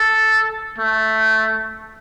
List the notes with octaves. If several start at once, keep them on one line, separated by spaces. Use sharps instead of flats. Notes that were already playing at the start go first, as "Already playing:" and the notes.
Already playing: A4
A3